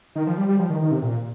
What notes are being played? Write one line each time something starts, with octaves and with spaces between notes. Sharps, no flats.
D#3
F3
G3
G3
F3
D#3
D#3
C3
A#2